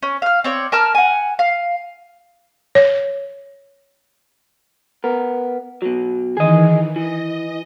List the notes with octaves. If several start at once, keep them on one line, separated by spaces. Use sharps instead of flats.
C#4
F5 F6
C4 C#5 D5
A#4 A5 A#5 F6
F#5 G#5
F5
C#5
B3 A#4
B2 F#3
D#3 E3 G#4 D#5
E3 D#5